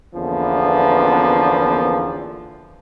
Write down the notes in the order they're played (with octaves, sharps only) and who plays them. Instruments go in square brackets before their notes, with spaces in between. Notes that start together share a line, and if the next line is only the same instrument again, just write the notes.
[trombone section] E2 D3 F3 A#3 B3 C#4